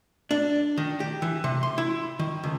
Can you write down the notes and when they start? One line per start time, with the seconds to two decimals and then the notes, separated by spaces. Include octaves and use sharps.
0.31 D4
0.77 D#3
1.00 G4
1.22 E3
1.44 C3
1.63 C6
1.78 E4
2.19 D#3
2.43 C#2